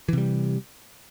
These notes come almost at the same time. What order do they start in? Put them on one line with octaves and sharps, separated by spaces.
E3 C3 G3